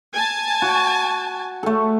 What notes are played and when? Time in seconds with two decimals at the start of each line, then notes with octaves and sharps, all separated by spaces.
0.14 G#5 A5
0.62 F#4
1.63 A3 A4